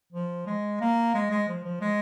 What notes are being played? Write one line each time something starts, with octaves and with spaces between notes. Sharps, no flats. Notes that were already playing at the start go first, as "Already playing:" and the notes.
F3
G#3
A#3
G#3
G#3
F3
F3
G#3